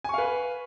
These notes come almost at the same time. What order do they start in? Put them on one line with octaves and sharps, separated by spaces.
G#5 C#6 F5 B4